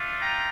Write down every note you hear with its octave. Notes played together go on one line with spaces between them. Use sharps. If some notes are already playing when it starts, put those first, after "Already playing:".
Already playing: A3 D4 F4
G5 A#5